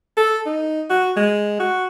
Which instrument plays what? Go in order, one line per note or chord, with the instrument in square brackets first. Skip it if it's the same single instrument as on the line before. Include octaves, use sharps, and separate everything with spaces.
[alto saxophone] A4
D#4
F#4
G#3
F#4